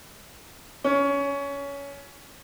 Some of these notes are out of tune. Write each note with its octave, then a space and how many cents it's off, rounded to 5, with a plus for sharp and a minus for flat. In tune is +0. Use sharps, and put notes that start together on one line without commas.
C#4 +20